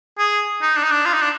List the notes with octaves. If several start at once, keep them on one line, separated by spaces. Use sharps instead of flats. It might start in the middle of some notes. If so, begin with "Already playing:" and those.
G#4
D#4
D4
D#4
D4
F4
D#4
D4